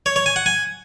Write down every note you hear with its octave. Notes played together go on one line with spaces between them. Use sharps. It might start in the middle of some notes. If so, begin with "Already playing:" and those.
C#5
C#5
G#5
F#5
G#5